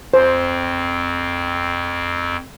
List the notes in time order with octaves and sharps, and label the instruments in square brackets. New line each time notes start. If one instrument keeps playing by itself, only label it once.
[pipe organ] F2 C4 [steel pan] C5